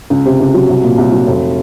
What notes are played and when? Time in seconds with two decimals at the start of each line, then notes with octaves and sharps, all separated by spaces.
0.10 C#2
0.25 C3
0.40 C#2
0.54 F#3
0.69 C2
0.83 A#2
0.98 C2
1.12 F#3
1.27 F1